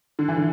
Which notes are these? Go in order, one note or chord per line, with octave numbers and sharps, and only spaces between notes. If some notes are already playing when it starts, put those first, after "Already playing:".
D3
E3
D3